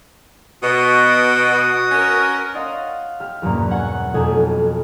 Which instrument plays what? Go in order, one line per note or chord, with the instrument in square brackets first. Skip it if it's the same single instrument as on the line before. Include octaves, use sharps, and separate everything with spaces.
[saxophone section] B2 [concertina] F#4 D#6
[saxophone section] C#4 A#4
[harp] C#5 D#5 F5 F#5 C6 A6
G4 F6
E2 G2 B2 F#3 A#3 C#4
F#5 G#5 C#6
B1 F2 A3 G#5 D#6